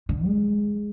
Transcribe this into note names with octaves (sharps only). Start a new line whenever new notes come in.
D3
G#3